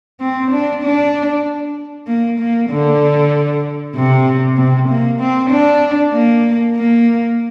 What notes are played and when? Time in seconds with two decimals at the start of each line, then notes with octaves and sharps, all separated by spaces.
0.21 C4
0.51 D4
0.83 D4
2.07 A#3
2.40 A#3
2.70 D3
3.95 C3
4.57 C3
4.89 A#3
5.20 C4
5.51 D4
6.13 A#3
6.77 A#3